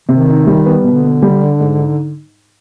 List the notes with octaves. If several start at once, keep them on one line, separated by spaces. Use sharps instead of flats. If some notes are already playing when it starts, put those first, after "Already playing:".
C3 D#3
D#4
G3
B3
B2 D3
B2
G3
D4
G#2
D#4